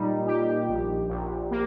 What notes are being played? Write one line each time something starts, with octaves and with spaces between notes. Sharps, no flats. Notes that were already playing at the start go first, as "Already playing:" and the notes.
Already playing: A#2 G3 D#4
G4
A#1
A#1
A#3